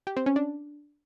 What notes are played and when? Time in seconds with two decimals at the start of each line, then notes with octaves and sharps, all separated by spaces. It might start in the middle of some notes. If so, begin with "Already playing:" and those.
0.07 G4
0.17 C4
0.26 C#4
0.36 D4